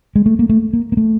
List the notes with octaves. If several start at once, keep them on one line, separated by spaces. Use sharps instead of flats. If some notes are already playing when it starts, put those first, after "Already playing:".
G#3
A3
A#3
A3
A#3
A#3
A3